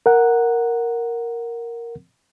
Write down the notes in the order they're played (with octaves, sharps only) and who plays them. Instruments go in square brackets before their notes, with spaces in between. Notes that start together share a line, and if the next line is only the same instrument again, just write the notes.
[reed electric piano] A#4 F#5